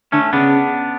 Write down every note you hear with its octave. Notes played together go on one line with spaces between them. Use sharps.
D3 A3 C#4
C#3 B3 D4